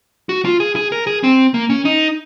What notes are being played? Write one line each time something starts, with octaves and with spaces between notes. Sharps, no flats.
F#4
F4
G#4
G#4
A#4
G#4
C4
A#3
C#4
D#4